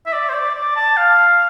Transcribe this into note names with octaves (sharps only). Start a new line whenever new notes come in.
E5
D5
C5
D5
D5
A5
F5